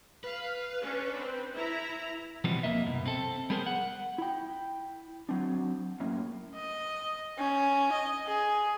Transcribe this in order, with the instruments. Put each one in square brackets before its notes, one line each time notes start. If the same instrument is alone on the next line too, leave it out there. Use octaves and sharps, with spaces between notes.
[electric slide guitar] B4 [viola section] F5
[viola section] C#4 D4
C4
E4 A#5
[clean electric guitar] B2 E3 F3 G3 B3 C4
D#2 A#3 D#5 E5
C2 F#2 B2
C4 A4
G3 B3 G#4 A#4 C5
F#5
[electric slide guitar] E4 G5
F#3 C4 D4
F#2 A2 A#3 C#4 E4
[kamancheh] D#5
C#4
D#5
G#4